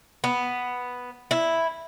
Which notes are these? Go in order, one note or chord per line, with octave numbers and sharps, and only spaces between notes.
B3
E4